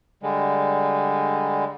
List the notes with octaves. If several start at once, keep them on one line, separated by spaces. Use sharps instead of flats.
D3 G3 G#3